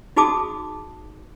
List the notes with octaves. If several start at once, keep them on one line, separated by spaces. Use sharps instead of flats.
D#4 F#4 G#4 A5 D6 D#6